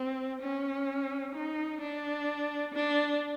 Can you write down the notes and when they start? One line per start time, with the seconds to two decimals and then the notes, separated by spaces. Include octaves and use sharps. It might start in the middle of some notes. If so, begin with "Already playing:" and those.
Already playing: C4
0.41 C#4
1.35 D#4
1.81 D4
2.74 D4